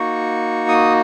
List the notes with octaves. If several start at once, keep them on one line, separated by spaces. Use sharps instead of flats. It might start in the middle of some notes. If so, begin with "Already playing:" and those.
Already playing: A#3 D#4 F#4 C#6
D#6